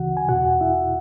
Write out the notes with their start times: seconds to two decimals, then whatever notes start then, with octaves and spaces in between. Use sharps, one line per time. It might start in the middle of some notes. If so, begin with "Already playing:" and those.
Already playing: D2 C#3 E3 F#4 F#5
0.17 G#5
0.28 E2 B2 F#4 F#5
0.61 E4 E5